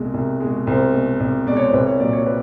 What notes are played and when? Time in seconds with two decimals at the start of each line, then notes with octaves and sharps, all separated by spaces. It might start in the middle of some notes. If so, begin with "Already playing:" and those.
Already playing: C2 B2 G#3
0.14 C2
0.40 B2 G#3
0.67 C2 C5
0.94 B2 G#3
1.20 C2
1.47 B2 G#3 D5
1.57 C#5
1.64 C5
1.73 C2 B4
1.87 C#5
2.00 A#2 F#3 D5
2.13 C#5
2.26 B4